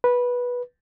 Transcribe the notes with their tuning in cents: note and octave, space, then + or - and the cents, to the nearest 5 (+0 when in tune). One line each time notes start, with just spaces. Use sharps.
B4 -15